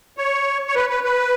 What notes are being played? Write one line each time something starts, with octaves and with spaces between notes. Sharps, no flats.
C#5
C#5
B4
B4
B4